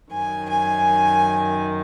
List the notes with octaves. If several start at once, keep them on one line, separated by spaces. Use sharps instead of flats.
F#2 D#3 G#5
G#5